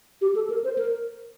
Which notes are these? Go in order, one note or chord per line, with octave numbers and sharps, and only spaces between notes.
G4
A4
A#4
C5
A#4